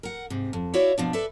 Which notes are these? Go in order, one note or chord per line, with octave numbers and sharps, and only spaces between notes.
A#4 F#5
G#2 C3
F2
E4 F#4 C#5 D5 E5 F5
B2 F3 D4
A4 B4 D5 E5